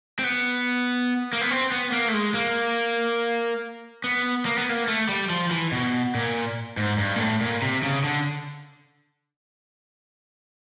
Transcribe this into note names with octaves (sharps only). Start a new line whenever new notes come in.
C4
B3
A#3
B3
C4
B3
A#3
A3
G#3
A#3
B3
A#3
B3
A#3
A3
G3
F3
E3
B2
A#2
G#2
G2
A#2
A2
A#2
C3
C#3
D3